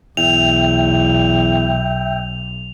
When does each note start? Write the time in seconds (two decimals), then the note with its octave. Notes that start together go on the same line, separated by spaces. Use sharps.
0.17 B1 E2 E5 G5 F7